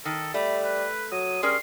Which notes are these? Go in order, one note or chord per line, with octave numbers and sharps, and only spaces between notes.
D#3 A4
G3 A3 B5
B4
F#3 D#6
G3 C#4 G#4 A#4 C6